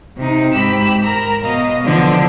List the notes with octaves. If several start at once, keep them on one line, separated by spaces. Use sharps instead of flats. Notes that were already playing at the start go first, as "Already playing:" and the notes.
C3 D#4
G#2 G4 B5 E6
A#4 A#5
B2 D#5 F5
D3 E3 F3 B3 D4